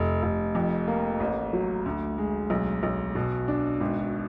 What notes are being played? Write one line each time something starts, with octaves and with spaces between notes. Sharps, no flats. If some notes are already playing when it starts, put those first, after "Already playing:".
Already playing: F1
F1
F2
A#3
A1
F#3
D2
G#3
B1
B1
B2
D4
G#1